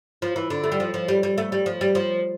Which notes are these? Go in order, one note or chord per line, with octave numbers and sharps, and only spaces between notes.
F3
E3
D3
A3
G3
F3
F3
G3
G3
A3
G3
F3
G3
F3